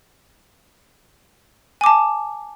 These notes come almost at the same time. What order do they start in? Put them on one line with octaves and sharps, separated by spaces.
G#5 D6 A5